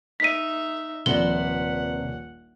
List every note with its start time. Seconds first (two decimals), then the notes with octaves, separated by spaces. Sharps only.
0.20 D#4 E5 B6 D#7
1.06 D#1 A#1 C3 B4 C5 D5 F#5 G7